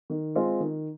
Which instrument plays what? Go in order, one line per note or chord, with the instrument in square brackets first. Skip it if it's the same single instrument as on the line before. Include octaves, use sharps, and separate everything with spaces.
[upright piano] D#3
G#3 C4 F4
D#3